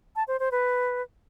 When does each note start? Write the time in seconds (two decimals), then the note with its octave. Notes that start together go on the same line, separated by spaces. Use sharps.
0.16 A5
0.28 C5
0.40 C5
0.51 B4